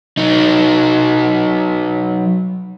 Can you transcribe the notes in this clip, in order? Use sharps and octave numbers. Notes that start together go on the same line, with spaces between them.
F#3 D#4